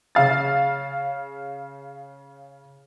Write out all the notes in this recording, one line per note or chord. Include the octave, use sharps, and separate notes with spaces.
C#3 F5 A6